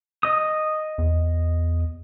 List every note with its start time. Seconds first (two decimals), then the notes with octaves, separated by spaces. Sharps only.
0.23 D#5 D#6
0.98 E2